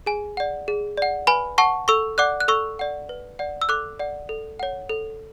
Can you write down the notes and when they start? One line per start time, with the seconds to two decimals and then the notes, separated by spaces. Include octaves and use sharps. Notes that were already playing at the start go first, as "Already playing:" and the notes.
0.06 G#4 G#5
0.37 D5 F#5
0.68 G#4
0.97 D5 F#5
1.27 B4 G#5 B5
1.58 F#5 A5 C#6
1.88 A4 C#6 E6
2.18 D5 F#5 D6 F#6
2.40 F#6
2.48 A4 C#6 E6
2.79 D5 F#5
3.09 B4
3.39 D5 F#5
3.62 E6
3.69 A4 D6 F#6
3.99 D5 F#5
4.29 A4
4.59 C#5 F#5
4.89 A4